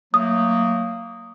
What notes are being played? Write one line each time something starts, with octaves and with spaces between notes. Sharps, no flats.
F#3 A3 A#3 D#6